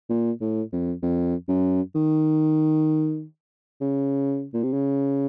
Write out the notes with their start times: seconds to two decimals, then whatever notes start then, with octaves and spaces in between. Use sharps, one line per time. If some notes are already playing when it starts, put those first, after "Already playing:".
0.10 A#2
0.41 A2
0.72 F2
1.03 F2
1.48 F#2
1.95 D#3
3.81 C#3
4.54 A#2
4.63 C3
4.73 C#3